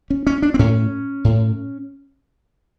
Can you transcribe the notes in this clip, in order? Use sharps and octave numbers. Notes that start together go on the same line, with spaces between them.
C#4
C#4
D4
C4
A2 C#4
A2